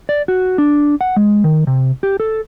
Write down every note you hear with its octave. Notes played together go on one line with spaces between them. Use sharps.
D5
F#4
D4
F#5
G#3
D#3
C3
G4
A4